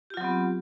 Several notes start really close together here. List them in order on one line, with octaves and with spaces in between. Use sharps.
G4 F4 F#3 C4 B3